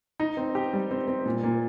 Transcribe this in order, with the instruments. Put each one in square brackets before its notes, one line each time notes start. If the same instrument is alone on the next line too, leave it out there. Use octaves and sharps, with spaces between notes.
[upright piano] D#4
C4
G4
G3
C4
C4
A#2
A#2